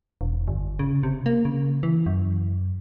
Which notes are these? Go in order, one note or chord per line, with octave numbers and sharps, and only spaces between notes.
E1
G1
C#3
C3
A#3
C#3
E3
F#2